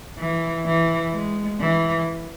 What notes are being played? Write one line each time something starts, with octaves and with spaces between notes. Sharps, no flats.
E3
E3
G#3
E3